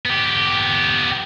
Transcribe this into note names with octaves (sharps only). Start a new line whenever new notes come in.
B3 G4